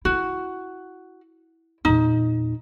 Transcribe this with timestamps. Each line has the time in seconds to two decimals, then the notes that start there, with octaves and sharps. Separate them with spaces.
0.05 E4 F#4
1.85 E2 A#2 D#4